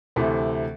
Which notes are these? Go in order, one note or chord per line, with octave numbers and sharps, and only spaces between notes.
D2 C3 E3 A3